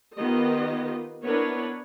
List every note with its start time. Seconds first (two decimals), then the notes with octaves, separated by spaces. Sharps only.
0.17 D#3 B3 F4 G4 D#5
1.24 B3 D4 E4 A#4 B4 C#5